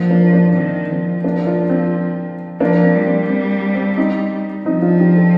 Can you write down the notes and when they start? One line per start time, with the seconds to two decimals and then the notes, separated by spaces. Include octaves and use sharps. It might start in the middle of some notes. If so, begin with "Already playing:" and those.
Already playing: F3 A#3 D4
0.10 A#3 D4
0.33 A#3 D4
0.55 D#3 C4
0.90 F3 C4
1.24 A#3 D4
1.47 D4 F4
1.69 C4
2.60 F3 A#3 D4
2.83 C4
2.95 G3
3.06 C4
3.29 C4
3.74 C4
3.97 C4 D#4
4.65 F3 C4 D#4
4.82 D4 F4
4.99 D#4 G4
5.16 F4 A4